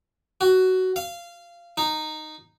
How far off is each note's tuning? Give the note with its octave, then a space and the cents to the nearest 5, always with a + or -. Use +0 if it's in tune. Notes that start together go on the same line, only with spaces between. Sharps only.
F#4 +10
F5 -20
D#4 -10